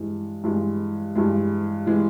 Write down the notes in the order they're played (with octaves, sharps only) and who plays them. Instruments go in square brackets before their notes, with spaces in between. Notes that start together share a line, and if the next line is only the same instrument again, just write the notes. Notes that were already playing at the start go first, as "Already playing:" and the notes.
Already playing: [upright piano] G2 E3 G#3
G2 E3 G#3
G2 E3 G#3
E3 G#3